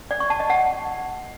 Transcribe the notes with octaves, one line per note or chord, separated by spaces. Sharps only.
D5
C#6
A5
D#5
F#5